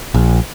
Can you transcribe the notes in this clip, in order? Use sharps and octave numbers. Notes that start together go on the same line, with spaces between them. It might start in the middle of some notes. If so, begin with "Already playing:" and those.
A#1